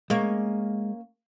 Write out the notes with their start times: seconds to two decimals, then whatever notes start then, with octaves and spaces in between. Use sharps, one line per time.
0.10 G#3 A#3 C#4